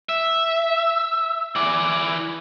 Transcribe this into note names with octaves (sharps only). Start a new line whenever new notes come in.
E5
E3 D5